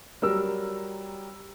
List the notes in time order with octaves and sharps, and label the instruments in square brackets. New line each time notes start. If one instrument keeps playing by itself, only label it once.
[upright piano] F#3 G3 A#4 E6